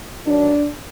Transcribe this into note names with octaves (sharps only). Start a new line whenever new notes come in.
F#2 D#3 F#3 D4